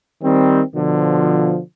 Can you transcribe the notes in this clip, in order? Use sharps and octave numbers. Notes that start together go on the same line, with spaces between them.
D#3 G3 C4
B2 D3 F3